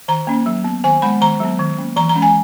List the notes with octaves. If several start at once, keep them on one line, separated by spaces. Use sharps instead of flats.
D#3 A#5
A#3 C#4
F#3
B3
D#3 G#5
G#3 B3 B5
D#3 A#5
F#3 B3
D#3
A#3 C#4
E3 A#5
A#5
G#3 C#4
G#5